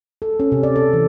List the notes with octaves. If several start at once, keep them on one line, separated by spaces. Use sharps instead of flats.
A4
C#4
C3
D5
A4
E3